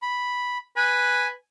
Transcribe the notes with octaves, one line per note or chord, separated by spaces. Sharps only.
B5
B4 G#5